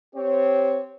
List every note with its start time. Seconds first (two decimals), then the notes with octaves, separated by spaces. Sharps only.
0.16 C4 G4 C#5